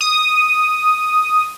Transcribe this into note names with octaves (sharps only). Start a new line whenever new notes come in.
D#6